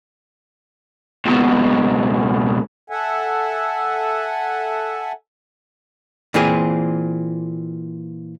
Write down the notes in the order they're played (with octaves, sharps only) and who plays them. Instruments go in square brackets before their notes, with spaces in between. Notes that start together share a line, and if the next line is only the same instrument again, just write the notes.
[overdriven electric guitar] C#2 B2
[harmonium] A4 E5 F#5 G#5
[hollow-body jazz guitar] A#2 E3 C4 G#4